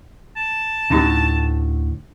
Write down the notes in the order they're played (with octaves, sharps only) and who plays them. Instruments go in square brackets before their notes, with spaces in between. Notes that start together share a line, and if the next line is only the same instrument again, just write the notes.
[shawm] A5
[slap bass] D2 A2 [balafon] C#4 D#4 G4